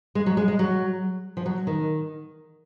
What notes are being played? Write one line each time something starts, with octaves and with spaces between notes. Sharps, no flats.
G#3
F#3
G#3
G#3
F#3
F3
F#3
D#3